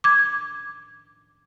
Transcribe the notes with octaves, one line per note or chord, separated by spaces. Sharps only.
D6 G#6